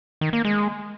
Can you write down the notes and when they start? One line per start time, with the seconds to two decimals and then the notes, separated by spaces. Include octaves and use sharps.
0.21 D#3
0.33 A#3
0.45 G#3